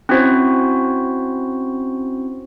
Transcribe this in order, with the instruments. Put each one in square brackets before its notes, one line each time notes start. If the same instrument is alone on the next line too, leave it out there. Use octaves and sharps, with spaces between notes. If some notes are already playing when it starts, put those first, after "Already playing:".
[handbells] C4 C#4 E4 F#4 C5